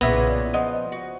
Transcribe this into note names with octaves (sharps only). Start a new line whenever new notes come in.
B1 A#2 C#3 E3 B3 E5 G#6 A#6
D5
F3 D#5 F#5
F#4